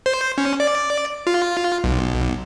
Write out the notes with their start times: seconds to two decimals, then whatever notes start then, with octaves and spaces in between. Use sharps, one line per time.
0.06 C5
0.38 C#4
0.60 D5
1.27 F4
1.84 B1